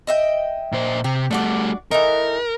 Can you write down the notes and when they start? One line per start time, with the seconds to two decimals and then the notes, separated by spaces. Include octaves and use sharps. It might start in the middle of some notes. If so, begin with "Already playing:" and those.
0.07 D#5 E5 G5
0.72 A#2 C5
1.04 C3 G4
1.31 G3 A3 D4 F#4 D5
1.91 E3 A3 D#4 A#4